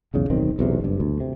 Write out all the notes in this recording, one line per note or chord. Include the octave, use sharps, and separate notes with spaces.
B1 E2 C#3
D1 B1 D#3 C4
B1 E2 C3
F#1 G2
D2
C3